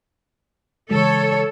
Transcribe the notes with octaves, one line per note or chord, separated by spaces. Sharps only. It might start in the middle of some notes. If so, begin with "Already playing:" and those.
C#3 E3 G#3 A4 C#5